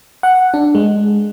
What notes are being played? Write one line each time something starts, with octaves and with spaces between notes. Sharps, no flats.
F#5
D4
G#3